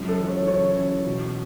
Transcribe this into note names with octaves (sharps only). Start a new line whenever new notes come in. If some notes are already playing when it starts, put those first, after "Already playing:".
Already playing: C#2 F#2
A4
E3
C#5
C#3 C#5
E3
B2